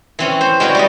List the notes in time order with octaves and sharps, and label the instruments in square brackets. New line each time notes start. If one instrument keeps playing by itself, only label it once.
[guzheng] E3 C4 C#4
C5
G#3 C#4 F#4 B4 D5
G3 G4 D#5